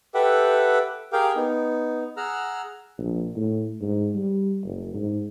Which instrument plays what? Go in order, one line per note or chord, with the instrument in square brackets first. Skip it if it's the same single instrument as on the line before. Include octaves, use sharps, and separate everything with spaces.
[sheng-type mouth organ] G4 A4 B4 E5 F#5 G5
G4 G#4 A#4 F5 G5
B3 D#4
G#4 F#5 A#5 E6 F6
[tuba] A#1
A2
G#2
G3
F#1
G#2